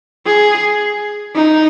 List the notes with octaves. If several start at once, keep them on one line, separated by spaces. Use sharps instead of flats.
G#4
D#4